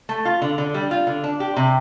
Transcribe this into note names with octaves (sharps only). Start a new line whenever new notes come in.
A3
F4
D3
D3
G3
F4
D3
D4
G4
C3